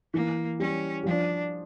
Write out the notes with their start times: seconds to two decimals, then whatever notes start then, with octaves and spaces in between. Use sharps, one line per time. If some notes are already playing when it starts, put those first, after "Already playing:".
0.14 E3 A#3
0.60 G3 C#4
1.03 G3
1.06 F3 D4